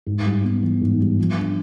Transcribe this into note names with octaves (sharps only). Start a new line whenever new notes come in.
G#2
G3
B3
E3
G#2
G3
F3
D4